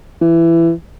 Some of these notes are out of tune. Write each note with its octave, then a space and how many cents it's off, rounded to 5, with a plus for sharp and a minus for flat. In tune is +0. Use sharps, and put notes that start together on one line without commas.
E3 +20